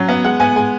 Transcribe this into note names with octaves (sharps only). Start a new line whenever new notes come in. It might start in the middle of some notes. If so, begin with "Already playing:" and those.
Already playing: F#3 C#4
B3
G#3 F#5
B3 G#5
G#3 G#5